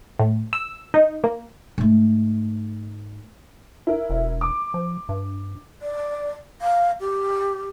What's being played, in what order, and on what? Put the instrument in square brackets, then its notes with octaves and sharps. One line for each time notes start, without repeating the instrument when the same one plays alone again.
[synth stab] A2
E6
D#4
A#3
[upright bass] G#2 A3
[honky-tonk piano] E4 A#4
[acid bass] E1
[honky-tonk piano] D6
[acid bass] F3
G2
[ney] D5
F5
G4